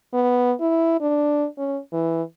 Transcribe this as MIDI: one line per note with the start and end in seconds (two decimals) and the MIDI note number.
0.13 0.53 59
0.60 1.00 64
1.00 1.47 62
1.58 1.79 61
1.93 2.22 52